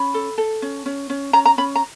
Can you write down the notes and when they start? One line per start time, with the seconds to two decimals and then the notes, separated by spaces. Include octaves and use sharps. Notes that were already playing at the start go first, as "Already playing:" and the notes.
Already playing: C#4 B5
0.14 A4
0.38 A4
0.62 C#4
0.86 C#4
1.10 C#4
1.33 C#4 A#5
1.45 A#5
1.58 C#4 B5
1.75 A#5